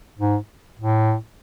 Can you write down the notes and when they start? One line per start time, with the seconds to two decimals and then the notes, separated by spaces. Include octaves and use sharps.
0.19 G#2
0.79 A2